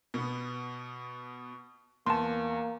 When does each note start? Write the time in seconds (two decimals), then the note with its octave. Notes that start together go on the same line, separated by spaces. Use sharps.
0.14 B2 B3
2.06 E2 A#3 A5 C6